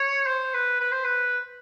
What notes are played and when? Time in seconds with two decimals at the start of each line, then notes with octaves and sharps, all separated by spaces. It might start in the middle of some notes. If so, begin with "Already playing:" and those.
Already playing: C#5
0.26 C5
0.54 B4
0.80 B4
0.92 C5
1.04 B4